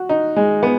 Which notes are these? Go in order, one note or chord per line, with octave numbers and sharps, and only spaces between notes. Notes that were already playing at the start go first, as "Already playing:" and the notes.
Already playing: F#4
D#4
G#3
B3